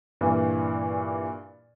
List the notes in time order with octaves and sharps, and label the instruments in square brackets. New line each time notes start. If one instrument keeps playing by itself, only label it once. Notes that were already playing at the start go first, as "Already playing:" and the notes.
[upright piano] G2 A#2 E3